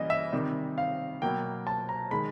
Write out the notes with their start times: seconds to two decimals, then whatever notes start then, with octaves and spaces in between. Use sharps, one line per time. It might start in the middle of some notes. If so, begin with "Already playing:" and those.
Already playing: C#3 E3 G3 A#3 D#5
0.10 E5
0.33 C3 D#3 G3
0.78 F5
1.22 B2 F#3 A#3 G5
1.67 A5
1.89 A#5
2.11 D#3 G#3 B5